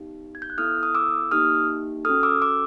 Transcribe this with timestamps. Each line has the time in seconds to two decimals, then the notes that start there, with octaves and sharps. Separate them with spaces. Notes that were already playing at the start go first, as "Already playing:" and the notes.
Already playing: B3 D#4 G4
0.35 G#6
0.42 G6
0.50 F#6
0.58 B3 E4 A4 D#6 F6
0.83 D#6
0.95 D6 E6
1.31 A#3 D#4 G4 D#6 F6
2.05 C#4 F#4 A4 D#6 F6
2.23 D6 E6
2.42 D6 E6